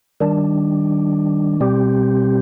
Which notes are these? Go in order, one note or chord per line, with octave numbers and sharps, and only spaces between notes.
D#3 G3 D4
B2 G3 C4 G4